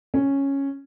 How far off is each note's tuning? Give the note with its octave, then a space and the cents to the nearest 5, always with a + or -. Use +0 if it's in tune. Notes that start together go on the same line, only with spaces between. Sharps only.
C#4 -5